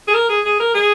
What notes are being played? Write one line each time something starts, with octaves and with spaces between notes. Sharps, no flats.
G#4
A#4
G#4
G#4
A#4
G#4